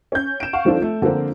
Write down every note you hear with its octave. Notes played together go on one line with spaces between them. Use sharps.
C#4 G6
D7 E7
F5 F#5 C#6
D#3 F3 C4 D4 F4 A4
A3
D3 F3 A#3 C4